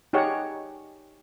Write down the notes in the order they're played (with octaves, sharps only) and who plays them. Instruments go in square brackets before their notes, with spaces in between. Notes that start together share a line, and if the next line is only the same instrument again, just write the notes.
[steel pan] D#4 G4 G#4 C#5 F#5